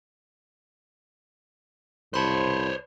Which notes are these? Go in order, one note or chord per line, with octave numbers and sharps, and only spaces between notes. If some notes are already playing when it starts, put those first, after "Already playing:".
C2 C5 C#5 A5 B5 C6